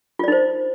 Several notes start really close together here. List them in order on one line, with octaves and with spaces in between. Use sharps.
F4 D5 D#4 C5